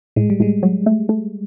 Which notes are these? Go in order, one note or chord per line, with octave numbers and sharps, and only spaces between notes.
A2 G#3
G3
A2 G#3
F#3
A3
A3